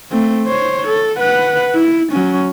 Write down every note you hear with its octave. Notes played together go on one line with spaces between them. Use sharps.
A3 C4
C5 C#5
A4
B4 F#5
E4
F#3 C#4